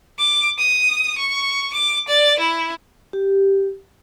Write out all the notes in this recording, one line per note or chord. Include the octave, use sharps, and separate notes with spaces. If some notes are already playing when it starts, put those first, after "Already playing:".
D6
D#6
C#6
D6
D5
E4
G4